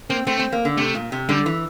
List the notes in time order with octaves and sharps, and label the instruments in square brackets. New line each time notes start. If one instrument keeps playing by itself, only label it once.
[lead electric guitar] A#3 [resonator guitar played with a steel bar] C4
[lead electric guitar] A3 [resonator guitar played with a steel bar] C4
[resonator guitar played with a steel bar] C4
A#3
D3
[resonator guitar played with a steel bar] C3 [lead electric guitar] A3
[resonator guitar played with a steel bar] A#2
C3
[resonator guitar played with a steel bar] D3 [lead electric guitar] G3
[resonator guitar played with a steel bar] E3